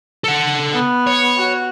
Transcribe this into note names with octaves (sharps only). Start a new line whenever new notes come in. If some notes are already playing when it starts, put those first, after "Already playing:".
A4 F#5
B3
C#5
F#4